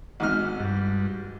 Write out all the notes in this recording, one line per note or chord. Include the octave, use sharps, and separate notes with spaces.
G#1 G#2 F6
G2